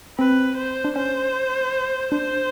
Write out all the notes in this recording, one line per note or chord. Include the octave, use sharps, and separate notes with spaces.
C4 B4
C5
D4
C#4 C5
D4 C5